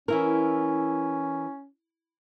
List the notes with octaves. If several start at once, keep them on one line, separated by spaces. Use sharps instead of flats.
E3 C#4 E4 A#4